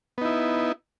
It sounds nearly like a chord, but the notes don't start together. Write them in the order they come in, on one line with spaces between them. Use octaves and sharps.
B3 D#4 E4